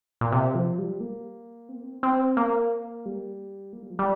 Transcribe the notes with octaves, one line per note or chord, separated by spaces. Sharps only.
A#2
C3
F3
G3
A#3
C4
A#3
C4
C4
A#3
G3
A#3
G3
F3
G3